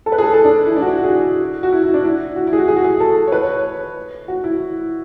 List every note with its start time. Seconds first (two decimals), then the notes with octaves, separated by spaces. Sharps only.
0.06 A4
0.12 B4
0.18 G#4
0.23 A4
0.33 A4
0.44 D4
0.66 E4
0.77 D4
0.82 F#4
0.87 E4
0.97 F#4
1.04 G#4
1.09 F#4
1.63 F#4
1.72 E4
1.83 E4
1.94 D4
2.04 E4
2.36 F#4
2.47 E4
2.53 G#4
2.58 F#4
2.68 G#4
2.76 F#4
2.85 G#4
3.00 A4
3.27 C#5
3.32 B4
3.43 C#5
4.28 F#4
4.44 E4